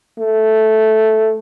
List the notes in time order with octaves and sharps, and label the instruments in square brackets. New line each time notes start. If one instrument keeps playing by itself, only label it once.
[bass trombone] A3